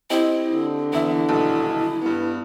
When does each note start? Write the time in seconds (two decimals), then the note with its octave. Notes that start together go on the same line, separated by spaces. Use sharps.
0.10 C4 E4 G4 D#5
0.53 D3
0.93 E2 E4 E5
1.29 D#1 B1 A4
2.01 G2 B3